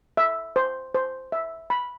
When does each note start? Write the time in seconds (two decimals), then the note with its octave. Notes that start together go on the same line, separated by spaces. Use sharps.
0.17 E5
0.56 C5
0.95 C5
1.32 E5
1.70 B5